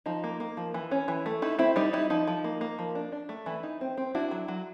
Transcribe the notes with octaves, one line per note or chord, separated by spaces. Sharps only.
F3 D#4
A#3
A#3
F3
E3
C#4
E3
A3
D#4 E4
C4 E4
G3 D#4
D#4 E4
F3 D#4
F3
A#3
A#3
F3
D4
D4
A3
E3 E4
D#4
C4
C4
D4 E4 F#4
F#3
F#3